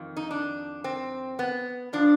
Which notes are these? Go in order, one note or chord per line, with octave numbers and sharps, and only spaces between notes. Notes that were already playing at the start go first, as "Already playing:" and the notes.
Already playing: F2 D#3
D#4
D4
C4
B3
F3 D4